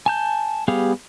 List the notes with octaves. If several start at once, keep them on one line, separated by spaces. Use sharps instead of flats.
G#5 A5 G6
G3 B3 G4 G#4 F5